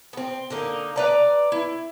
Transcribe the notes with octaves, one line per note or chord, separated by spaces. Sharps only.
B3 C4
D3 A#3 D#4
B4 D5 A#5
E4